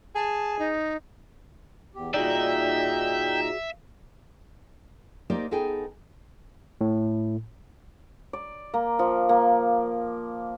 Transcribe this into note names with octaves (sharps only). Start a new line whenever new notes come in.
G#4 A5
D#4
E2 G4
A#2 D#4 F#4 G#4 D5 E5 G5 A#5
A#3 D#4 G4 C5 D5
B3 D#4 G#4 A4 G5 G#5
A2
D5
A#3
F3
A#3